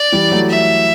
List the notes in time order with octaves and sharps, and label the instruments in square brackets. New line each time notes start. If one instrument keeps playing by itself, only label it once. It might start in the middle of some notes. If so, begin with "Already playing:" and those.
Already playing: [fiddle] D5
[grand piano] E3 G3
F#3 A3
[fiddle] E5